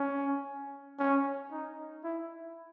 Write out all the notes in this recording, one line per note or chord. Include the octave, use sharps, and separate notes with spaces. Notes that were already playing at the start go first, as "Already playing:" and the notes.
Already playing: C#4
C#4
D#4
E4